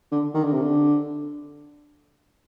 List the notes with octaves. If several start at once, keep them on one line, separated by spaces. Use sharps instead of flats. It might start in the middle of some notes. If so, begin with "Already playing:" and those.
D3
D#3
D3
C3
D3